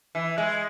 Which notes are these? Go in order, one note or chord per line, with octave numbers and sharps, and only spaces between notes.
E3
G#3